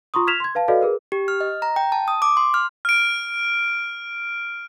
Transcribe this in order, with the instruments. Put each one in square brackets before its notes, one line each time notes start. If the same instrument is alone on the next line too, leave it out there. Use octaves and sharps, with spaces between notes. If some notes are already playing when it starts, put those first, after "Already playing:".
[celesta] F4 A#5 C6 C#6 D#6
F6 G#6 B6 E7 F7
C6 G#6
B4 F5 A5
F#4 A4 B4 D5 D#5 F5
G#4 A#4 B4
[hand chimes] G4
F6
D#5
A#5
G5
A5
D#6
D6
C6
F6
[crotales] F6 D7